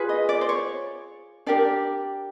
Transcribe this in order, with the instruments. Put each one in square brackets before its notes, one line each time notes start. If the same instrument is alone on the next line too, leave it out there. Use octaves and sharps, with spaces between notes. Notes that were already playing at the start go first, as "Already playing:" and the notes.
Already playing: [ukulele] F4 G#4 B4
D#5
D5
C5
C#5
D4 G4 A#4 D5